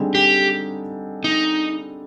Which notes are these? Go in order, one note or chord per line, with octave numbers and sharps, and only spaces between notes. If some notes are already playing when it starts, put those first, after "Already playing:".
Already playing: D3 G3 C4 D#4 G#4
G4
D#4